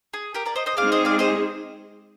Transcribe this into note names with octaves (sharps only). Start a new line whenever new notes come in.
G#4
G4 A#4
A#4 D5
C5 D#5
C5 D#5
G#3 C4 D#4 G#4 D5 F5
C5 D#5
D5 F5
C5 D#5